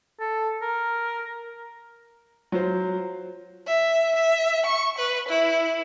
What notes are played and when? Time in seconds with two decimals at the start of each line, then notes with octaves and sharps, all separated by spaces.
0.20 A4
0.62 A#4
2.52 F#3 F4 C5
3.67 E5
4.15 E5
4.66 C#6
4.99 B4
5.29 E4